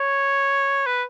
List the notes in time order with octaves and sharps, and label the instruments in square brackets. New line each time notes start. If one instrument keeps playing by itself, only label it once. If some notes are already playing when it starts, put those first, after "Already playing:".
Already playing: [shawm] C#5
B4